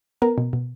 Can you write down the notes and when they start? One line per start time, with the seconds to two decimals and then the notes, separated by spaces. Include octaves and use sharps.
0.22 B3 A#4
0.38 B2
0.53 B2